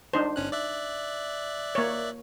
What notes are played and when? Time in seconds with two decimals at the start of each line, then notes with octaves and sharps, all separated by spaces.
0.13 D4 D#4 C5
0.36 G1 C#4 F#6
0.52 D5 E5 F#6
1.75 A#3 C#5